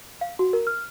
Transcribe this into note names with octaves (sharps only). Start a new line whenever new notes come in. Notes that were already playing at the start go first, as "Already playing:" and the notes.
F5
F#4
A#4
F6